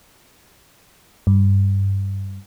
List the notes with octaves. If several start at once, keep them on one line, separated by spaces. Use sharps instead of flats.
G2